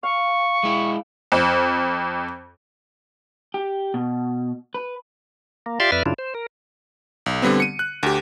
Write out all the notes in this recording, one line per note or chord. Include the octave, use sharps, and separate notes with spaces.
F5 C#6
G#3 E4
F2
G4
B2
B4
A#3
F4 G4 D5 E5 F5 C6
F2 B4 D5 E5 F6
F#2 C#3 D4 E4 F4
C5
A#4
B1
D3 G3 B3 C4
C#7 D#7
F#6
D2 G4